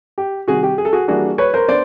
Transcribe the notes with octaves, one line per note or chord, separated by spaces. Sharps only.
G4
C3 D#3 G3 F#4 G#4
G4
G#4
A4
F#4 G#4
E3 G3 A#3 D4 F#4 G#4
B4 C#5
A#4 C5
B3 D4 C5 D5